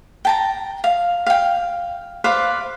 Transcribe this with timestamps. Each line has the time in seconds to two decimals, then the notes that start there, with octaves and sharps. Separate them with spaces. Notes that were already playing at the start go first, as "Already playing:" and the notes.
0.25 G5 A5 A#5
0.84 F5
1.27 F5 G5
2.24 B4 C5 D5 F5